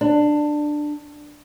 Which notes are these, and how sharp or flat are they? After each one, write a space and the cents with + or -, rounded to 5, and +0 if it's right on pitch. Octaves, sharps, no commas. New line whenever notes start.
D4 +15